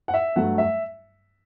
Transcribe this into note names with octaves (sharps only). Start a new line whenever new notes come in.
F#5
E5
G2 F#3 A3 F#5
E5